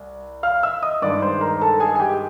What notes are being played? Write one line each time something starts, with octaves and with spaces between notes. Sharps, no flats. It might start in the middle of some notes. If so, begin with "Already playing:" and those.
Already playing: C2
F5 F6
E5 E6
D#5 D#6
G2 D#3 G#3 D5 D6
C5 C6
A#4 A#5
A4 A5
G#4 G#5
G#5
G4 G5